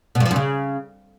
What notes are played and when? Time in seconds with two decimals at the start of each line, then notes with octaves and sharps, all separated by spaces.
0.15 B2
0.20 G2
0.26 F3
0.31 F#2
0.36 C#3